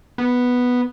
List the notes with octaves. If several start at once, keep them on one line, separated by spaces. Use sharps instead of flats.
B3